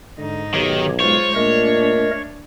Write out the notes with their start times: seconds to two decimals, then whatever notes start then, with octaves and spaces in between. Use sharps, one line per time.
0.18 G#2 D3 D#4
0.54 B1 D#3 G4 C#5
1.00 G#3 F4 C5 C#5
1.35 A#2 A3 D4 A#4 D#5